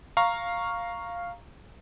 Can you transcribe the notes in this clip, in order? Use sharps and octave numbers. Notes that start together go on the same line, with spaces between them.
F5 A#5 C#6